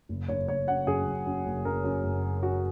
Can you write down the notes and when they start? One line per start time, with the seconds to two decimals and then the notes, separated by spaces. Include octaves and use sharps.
0.09 F#1
0.28 F#1 C#5
0.48 F#1 C#5
0.68 F#2 F#5
0.87 F#2 G#4
1.06 F#2
1.26 F#2
1.45 F#1
1.65 F#2 A#4
1.84 F#2
2.04 F#1
2.23 F#3
2.43 F#3 F#4